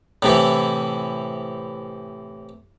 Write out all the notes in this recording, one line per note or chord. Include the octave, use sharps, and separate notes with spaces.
A2 C3 E3